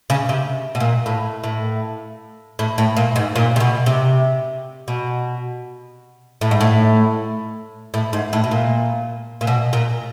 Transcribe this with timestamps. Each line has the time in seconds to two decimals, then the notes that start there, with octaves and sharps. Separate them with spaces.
0.10 C#3
0.29 C3
0.75 B2
0.80 A#2
1.06 A2
1.44 A2
2.59 A2
2.78 A2
2.97 A#2
3.16 G#2
3.36 A#2
3.56 C3
3.60 B2
3.86 C3
4.88 B2
6.41 A2
6.51 G#2
6.61 A2
7.94 A2
8.13 G#2
8.33 A2
8.44 B2
8.51 A#2
9.41 A#2
9.47 B2
9.73 A#2